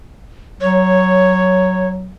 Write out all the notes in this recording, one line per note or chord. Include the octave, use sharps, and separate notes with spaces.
F#3 C#5